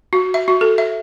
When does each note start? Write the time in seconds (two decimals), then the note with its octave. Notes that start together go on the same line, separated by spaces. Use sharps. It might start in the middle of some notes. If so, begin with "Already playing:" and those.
0.13 F#4
0.34 E5
0.48 F#4
0.61 A4
0.78 E5